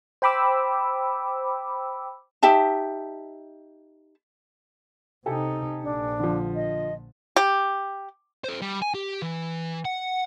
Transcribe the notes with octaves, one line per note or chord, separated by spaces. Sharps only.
C5 G5 B5 D6 E6
D#4 G4 E5 A5
C3 D#4 G4 A4 G#5
A#1 D4
D3 F3
D#5
G4
A4 C5
G3
G#5
G4
E3
F#5